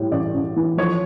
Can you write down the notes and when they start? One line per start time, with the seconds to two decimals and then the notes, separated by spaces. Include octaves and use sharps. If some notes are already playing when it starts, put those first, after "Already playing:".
Already playing: A2 G3
0.12 A1 D5
0.34 A1
0.56 E3
0.78 F3 C#5